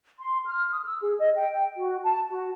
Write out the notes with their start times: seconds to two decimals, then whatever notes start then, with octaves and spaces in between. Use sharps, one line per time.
0.19 C6
0.46 F6
0.70 D#6
0.85 E6
1.02 G#4
1.19 D#5
1.36 G5
1.78 F#4
2.04 A5
2.30 F#4